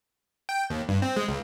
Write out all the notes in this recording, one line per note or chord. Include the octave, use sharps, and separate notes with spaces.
G5
D#2
G2
C4
G#3
C#2